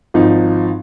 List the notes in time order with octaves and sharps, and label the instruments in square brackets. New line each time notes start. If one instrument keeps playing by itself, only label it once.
[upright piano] G#1 F3 D#4